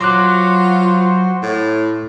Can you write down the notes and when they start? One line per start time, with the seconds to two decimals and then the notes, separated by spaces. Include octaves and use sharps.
0.01 F#3 F4 F#4 C5 C6 D6 F#6
1.43 A2